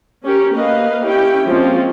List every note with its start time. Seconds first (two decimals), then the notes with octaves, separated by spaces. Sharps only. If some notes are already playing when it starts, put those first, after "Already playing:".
0.24 C#4 G4 A#4
0.53 A#3 B4 D#5 F5
1.04 C#4 E4 G4 G5
1.47 F3 G#3 A#3 C4 C#4 F4